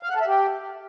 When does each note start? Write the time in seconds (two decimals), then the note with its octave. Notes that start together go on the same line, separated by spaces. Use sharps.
0.03 F5
0.09 F#5
0.15 A4
0.21 E5
0.27 G4